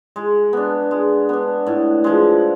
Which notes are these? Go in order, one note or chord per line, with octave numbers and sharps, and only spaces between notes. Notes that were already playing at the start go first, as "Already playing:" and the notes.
G#3
B3 D4
G#3
B3 D4
A2
F3 G#3